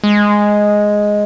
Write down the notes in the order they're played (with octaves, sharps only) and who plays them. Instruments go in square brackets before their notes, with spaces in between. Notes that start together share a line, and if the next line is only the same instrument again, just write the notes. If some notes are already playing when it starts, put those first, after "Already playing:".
[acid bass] G#3